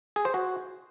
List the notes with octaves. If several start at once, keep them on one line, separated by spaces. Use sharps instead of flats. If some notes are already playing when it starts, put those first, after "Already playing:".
G#4
C5
F#4